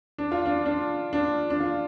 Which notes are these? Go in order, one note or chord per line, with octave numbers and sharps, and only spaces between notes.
D4
F4
D4
D4
D4
D4
F4